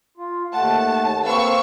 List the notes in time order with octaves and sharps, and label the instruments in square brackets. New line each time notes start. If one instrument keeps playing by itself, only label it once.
[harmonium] F4
[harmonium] D#2 A3 F#5 [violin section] A5
[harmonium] A#3 C4 B4 [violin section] F5 C#6 E6